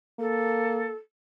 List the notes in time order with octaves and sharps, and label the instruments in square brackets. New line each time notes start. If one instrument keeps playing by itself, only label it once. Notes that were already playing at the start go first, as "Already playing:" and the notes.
[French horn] A#3 [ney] A4